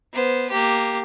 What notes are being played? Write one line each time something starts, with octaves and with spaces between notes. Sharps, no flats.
B3 C5
A#3 G4